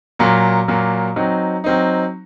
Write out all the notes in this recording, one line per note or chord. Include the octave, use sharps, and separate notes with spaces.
A#2 F#3 A#3
A#2 F#3 A#3
F#3 C4 D#4
F#3 C4 D#4